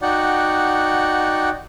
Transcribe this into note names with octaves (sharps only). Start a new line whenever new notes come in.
D#4 F#4 D5 F#5 G5